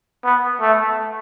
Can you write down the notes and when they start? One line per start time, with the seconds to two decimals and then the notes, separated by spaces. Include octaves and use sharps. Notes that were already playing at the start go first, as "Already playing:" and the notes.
0.25 B3
0.61 A3